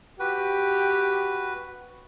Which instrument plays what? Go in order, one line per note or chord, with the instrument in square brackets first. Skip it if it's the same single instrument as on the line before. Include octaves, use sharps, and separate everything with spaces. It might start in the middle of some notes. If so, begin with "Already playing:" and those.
[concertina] F#4 B4 [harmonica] G4